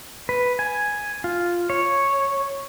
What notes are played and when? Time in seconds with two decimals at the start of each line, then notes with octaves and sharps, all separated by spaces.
0.29 B4
0.59 G#5
1.24 F4
1.70 C#5